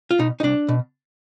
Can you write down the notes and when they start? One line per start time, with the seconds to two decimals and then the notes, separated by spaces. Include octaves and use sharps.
0.11 F4
0.19 B2 D#4
0.40 D#4
0.43 C2 D4
0.68 B2